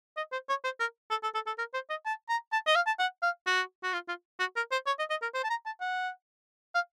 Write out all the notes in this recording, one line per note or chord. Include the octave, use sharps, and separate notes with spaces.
D#5
C5
C#5
C5
A#4
A4
A4
A4
A4
A#4
C5
D#5
A5
A#5
A5
D#5
F5
A5
F#5
F5
F#4
F#4
F4
F4
F#4
A#4
C5
C#5
D#5
D#5
A#4
C5
A5
A#5
A5
F#5
F5